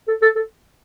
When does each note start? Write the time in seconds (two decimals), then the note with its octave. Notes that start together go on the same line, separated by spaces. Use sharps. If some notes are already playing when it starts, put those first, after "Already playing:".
0.08 A4
0.22 A4
0.36 A4